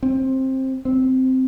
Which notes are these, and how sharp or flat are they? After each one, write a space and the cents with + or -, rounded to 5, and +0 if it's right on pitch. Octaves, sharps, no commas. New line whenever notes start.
C4 +15
C4 -10